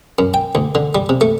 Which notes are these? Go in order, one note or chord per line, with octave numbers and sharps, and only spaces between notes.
F#2
G5
D2
D3
G3
C3
A3